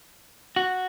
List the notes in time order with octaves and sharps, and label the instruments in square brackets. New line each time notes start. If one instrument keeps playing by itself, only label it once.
[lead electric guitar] F#4